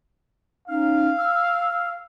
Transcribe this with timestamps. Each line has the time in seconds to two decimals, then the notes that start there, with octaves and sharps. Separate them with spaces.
0.68 C#4 D#4 F5 F6
1.16 E6 F6